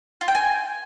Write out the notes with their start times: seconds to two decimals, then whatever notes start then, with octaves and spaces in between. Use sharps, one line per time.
0.21 F4
0.28 G5
0.35 G#5